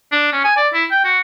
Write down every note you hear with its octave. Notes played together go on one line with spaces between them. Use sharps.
D4
C#4
G#5
D5
E4
G5
F#4